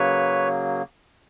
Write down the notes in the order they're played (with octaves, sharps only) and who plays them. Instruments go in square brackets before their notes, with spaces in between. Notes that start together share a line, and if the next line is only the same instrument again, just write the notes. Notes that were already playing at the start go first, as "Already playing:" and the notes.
Already playing: [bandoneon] C#3 F#3 A#3 B4 C#5